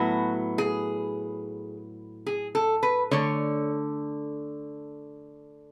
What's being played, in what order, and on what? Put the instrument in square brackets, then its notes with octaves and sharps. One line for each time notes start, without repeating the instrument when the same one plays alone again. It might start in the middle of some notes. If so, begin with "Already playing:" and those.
Already playing: [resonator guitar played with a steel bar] A2 F#3 B3 F#4
G#4
G#4
A4
B4
D3 A3 C#5